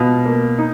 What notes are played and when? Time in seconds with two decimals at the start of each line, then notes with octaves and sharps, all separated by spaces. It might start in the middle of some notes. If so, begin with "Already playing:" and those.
Already playing: B2 F4
0.25 A#3
0.59 D#4